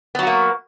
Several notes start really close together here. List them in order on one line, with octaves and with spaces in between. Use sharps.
B3 F#3 F#4 A#3